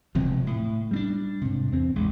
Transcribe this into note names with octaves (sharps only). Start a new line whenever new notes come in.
E1 C3 F3
A2
G3 C4 D4
G#2 C3
E2 C4
A1 G#3